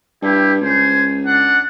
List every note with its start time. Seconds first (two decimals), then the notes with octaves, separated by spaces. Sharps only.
0.22 G2 E4 G4
0.61 C#2 C5 G#5
1.25 D4 F#5